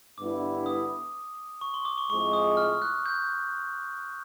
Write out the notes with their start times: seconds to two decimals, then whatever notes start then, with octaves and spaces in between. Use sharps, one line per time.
0.18 G2 D3 G3 B3 E4 D6
0.66 D#6
1.61 C#6
1.74 C6
1.85 D6
1.98 C#6
2.10 A2 F3 G#3 C4 C#6
2.33 D#6
2.57 F6
2.82 F#6
3.06 G6